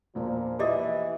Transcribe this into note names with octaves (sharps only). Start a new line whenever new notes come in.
E1 A#2 F3 A#3
E3 G4 D5 D#5 D6 D#6